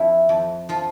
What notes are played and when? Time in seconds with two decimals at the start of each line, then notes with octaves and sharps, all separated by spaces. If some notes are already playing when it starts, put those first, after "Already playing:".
Already playing: F2 E4
0.29 F2
0.69 F3 F4